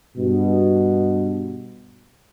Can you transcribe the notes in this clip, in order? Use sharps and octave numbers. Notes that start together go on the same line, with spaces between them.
G2 B2